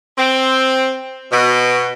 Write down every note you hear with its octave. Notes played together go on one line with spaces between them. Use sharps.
C4
B2